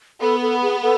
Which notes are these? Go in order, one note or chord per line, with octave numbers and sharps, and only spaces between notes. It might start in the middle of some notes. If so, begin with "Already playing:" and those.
B3 A4
A4
G#4
A4